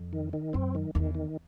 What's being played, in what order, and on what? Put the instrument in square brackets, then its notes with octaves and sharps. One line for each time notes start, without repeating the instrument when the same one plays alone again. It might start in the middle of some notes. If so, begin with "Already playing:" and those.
Already playing: [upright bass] F2
[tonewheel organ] D#3
D#3
[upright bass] F#2 [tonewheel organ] C4
[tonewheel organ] D#3
[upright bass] E2 [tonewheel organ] D#3
[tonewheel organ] D#3